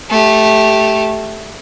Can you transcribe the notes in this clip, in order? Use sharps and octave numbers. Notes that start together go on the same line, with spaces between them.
A3 G4